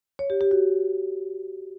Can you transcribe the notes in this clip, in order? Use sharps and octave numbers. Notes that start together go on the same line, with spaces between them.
C#5
G4
G4
F#4